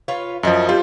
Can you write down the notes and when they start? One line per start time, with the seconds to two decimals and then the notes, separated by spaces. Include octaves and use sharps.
0.08 F4 B4 C#5
0.43 F#2 F3 E4 D#5
0.69 G3 C4 F4